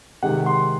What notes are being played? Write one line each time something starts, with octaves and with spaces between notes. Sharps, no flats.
C3 D#3 G#3 F#5
C6